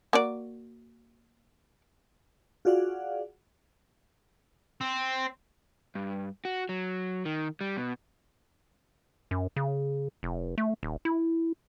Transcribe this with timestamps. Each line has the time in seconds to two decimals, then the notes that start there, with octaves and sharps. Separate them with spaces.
0.13 A#3 F#4 D5
2.65 F4 F#4 G#4 D5 F5 F#5
4.81 C4
5.95 G2
6.45 F#4
6.69 F#3
7.25 D#3
7.61 G3
7.77 B2
9.31 F#2
9.56 C#3
10.23 F1
10.58 A3
10.83 D#1
11.05 E4